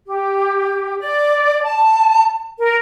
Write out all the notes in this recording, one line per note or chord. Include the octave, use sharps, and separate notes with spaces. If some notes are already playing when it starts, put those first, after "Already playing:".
G4
D5
A5
A#4